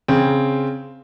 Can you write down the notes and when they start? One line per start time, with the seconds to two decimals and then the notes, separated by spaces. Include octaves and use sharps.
0.08 C#3 C4